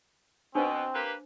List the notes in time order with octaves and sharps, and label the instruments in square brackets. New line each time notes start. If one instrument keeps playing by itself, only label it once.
[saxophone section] B2 [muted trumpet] C4 [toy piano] D4 C5
[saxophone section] A#3 G4 B4